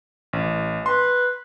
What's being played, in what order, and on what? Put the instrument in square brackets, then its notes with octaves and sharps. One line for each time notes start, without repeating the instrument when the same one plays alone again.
[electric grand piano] A1
[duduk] B4 [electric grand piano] C6